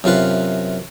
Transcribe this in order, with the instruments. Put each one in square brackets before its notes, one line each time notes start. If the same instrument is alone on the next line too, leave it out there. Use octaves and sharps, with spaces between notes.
[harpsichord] F#2 C3 F4 B4